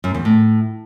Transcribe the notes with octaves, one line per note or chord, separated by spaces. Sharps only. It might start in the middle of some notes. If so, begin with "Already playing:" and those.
F#2
E2
A2